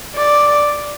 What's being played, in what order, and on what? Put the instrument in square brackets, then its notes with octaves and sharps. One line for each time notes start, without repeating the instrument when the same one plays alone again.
[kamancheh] D5